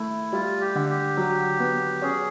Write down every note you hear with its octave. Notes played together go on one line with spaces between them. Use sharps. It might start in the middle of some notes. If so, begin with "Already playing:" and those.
Already playing: A3 E4
G3 F4
G4
D3
G4
F#3
B3
C#4 G#4